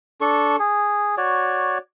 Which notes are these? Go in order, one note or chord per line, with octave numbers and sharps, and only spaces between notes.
D4 A4 C#6
G#4
F#4 C#5 D5